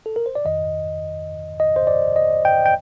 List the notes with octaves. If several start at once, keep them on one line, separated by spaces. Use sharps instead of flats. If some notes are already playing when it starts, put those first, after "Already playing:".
A4
A#4
C5
D5
F2 D#3 D#5
D#5
C5
D5
D#5
G5
G5